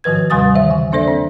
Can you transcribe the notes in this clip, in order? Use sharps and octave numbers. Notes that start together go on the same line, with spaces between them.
G#2 D#3 F3 B4 G#6
D#2 C3 G3 G#5 D#6 A6
D#3 E3 C5 E5
C#3 G#5
A#3 D4 A4 C5 D5 E5
C4